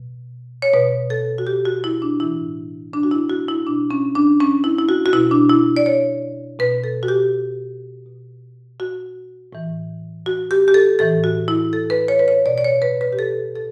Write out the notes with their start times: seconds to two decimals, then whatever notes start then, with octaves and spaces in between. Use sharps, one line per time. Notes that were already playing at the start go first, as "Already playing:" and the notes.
Already playing: B2
0.62 C#5
0.73 B2 B4
1.10 A4
1.38 F#4
1.47 G4
1.65 F#4
1.84 E4
2.02 D4
2.20 A2 E3 E4
2.93 D4
3.03 F#4
3.11 E4
3.29 F#4
3.48 E4
3.66 B2 D4
3.91 C#4
4.15 D4
4.40 C#4
4.64 E4
4.78 E4
4.89 F#4
5.06 F#4
5.13 B2 E4
5.31 D4
5.49 E4
5.76 D5
5.86 C#5
6.59 B2 B4
6.84 A4
7.03 F#4
7.08 G4
8.06 B2
8.80 F#4
9.53 A2 E3
10.26 F#4
10.51 G4
10.68 G4
10.74 A4
10.99 A2 E3 A4
11.24 F#4
11.48 E4
11.73 A4
11.90 B4
12.08 C#5
12.19 B4
12.28 C#5
12.46 B2 D5
12.58 D5
12.64 C#5
12.82 B4
13.01 B4
13.13 G4
13.19 A4
13.55 A4